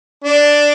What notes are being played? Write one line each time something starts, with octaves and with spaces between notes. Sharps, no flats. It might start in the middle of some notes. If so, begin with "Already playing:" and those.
D4